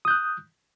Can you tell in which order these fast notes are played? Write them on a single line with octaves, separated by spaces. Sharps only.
D#6 G6 F#6